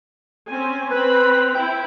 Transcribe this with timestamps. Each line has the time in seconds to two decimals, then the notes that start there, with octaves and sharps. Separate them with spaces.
0.48 C4 C#4 G#5
0.91 C4 B4 B5
1.55 E4 G5